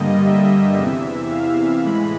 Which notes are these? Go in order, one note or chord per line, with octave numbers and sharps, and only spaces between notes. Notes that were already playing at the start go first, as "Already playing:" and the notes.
Already playing: G2 D3 G3 A#3 D#5
E5
E2 C3 E3
F5
A2 E3 G#3 B5